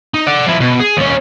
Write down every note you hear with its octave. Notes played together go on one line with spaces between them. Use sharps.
D#4
D5 F#5
F3 E4
B2
G#4
D#2 C#4